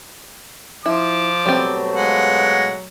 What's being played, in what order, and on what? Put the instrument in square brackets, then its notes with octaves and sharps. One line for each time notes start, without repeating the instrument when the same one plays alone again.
[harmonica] F3 [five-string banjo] E4 [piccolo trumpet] D6
[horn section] B2 F#3 A3 [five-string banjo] G3 C4
[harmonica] G#3 F#5 [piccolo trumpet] F5